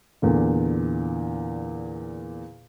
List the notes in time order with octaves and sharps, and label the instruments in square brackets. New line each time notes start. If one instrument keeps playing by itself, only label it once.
[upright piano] E2 A#2 D3